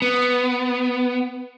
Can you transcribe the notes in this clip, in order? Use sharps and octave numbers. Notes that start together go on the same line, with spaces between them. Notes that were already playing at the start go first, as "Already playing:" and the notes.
B3